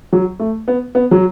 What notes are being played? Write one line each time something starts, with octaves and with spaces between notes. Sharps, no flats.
F#3
A3
B3
B3
F#3